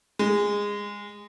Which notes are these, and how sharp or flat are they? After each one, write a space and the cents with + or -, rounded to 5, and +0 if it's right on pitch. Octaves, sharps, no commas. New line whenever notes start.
G#3 -20